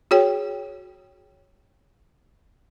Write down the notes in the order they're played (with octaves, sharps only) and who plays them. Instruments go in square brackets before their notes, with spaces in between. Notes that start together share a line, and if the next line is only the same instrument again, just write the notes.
[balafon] F#4 G#4 C#5 G5